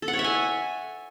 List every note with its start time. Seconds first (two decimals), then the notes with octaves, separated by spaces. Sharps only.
0.02 A4
0.08 F#5
0.13 C#5
0.19 E5
0.24 G#5